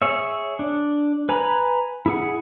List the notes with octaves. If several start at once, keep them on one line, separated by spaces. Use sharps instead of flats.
G#4 C#5 E5
D4
B4 G#5 A#5 B5
E4 G#4 F#5